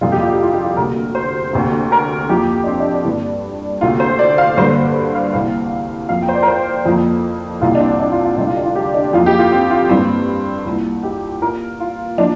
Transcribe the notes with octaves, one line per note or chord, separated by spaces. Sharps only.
F2 C3 G3 A#3 F4
G4
F4
G4
F4
G4
F4
D2 C3 A#3 A#4
C5
D2 C3 A#3
A#4
F2 F3 A#3 G4
D4
C4
D4
D4
G2 G3 A#3
D2 C3 A#3 F4
C5
D5
F5
G2 D3 G3 A#3 C5
F5
C2 C3 A#3 F5
F2 F3 A#3 F5
G5
C5
D5
A#4
C5
F2 F3 A#3
C2 C3 A#3 F4
D4
C4
D4
F4
F4
D2 C3 G3 D4
F4
D4
F4
G4
D4
F2 F3 A#3 F4
G4
F4
C4
F4
G2 G3 A#3 C4
C2 A#2 A#3
G4
A#2 A#3 A#4
F4
F3 A#3 D4